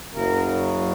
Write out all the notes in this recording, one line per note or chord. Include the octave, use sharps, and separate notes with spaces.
F#1 F#2 C#3 F#3 A#4